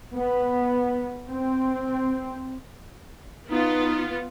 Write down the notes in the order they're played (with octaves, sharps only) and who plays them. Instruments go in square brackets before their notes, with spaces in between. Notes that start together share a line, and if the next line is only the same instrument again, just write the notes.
[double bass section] B3
C4
[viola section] B3 F4 [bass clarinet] D#4